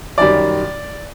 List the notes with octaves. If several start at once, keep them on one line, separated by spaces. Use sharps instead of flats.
F#2 D#3 G3 D5